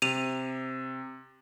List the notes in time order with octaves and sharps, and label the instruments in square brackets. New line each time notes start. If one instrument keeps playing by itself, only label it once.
[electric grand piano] C3 [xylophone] D#7 F7